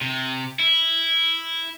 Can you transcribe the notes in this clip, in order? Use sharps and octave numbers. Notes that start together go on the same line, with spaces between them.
C3
E4